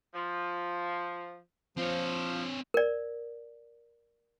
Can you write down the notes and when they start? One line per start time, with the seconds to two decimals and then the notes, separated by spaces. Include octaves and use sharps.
0.14 F3
1.77 F3 C4 C#5
2.74 A#4 D5